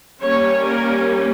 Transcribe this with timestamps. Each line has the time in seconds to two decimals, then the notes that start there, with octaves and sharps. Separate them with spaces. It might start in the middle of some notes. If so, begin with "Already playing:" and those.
0.21 G3 A#3 C#4 C#5
0.64 A#4